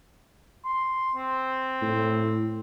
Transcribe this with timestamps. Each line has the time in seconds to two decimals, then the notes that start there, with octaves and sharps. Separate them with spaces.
0.65 C6
1.15 C4
1.82 A2